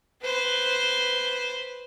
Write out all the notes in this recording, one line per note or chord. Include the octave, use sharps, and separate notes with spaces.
B4 C5